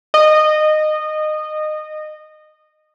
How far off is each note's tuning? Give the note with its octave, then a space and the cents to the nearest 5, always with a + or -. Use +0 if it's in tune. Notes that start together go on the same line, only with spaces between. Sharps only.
D#5 -20